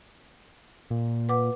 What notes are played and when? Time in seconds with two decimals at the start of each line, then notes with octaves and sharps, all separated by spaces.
0.90 A#2
1.29 B4 F#5 D6